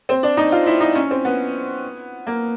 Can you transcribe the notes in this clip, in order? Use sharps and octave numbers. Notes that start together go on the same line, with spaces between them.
C4
D4
D#4
F4
E4
D#4
C#4
C4
B3
A#3